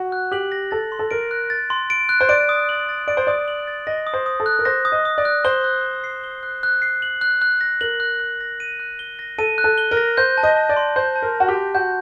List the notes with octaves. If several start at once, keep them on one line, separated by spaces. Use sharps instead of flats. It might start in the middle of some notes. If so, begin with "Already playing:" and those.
Already playing: F#4
F#6
G4 F#7
A#6
A4 A6
C6
A4
A#4 D7
F#6
A6
C6
D7
F#6
C5
D5 D7
D#6
F#7
A6
D5 D7
C5
D5 D#6
F#7
A6
D#5 A#6
D#6
C5
D#6
A4
F#6
A#4
C5 A#6
D#6
D#5
D#6
D5
F#6
C5 G7
F#6
F#6
C7
G7
F#6
F#6
C7
F#7
F#6
F#6
A#6
A#4 F#7
F#6
F#6
A#6
D#7
F#6
G7
A#6
A4 D#7
F#6
A4
G7
A#4
A#6
C5 G6
A5
D#5
A5
D5
C6
C5 G6
A5
A#4
A5
F#4
G4
C6
F#4 G6